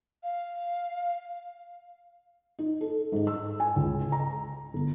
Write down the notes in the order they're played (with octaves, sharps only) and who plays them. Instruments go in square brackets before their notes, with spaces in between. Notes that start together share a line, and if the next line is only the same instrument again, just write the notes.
[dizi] F5
[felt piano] D#4
A4
G#2
E6
G#5
C#2
A#5
G1